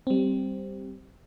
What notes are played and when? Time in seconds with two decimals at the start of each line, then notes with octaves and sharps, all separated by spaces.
0.07 G3 C4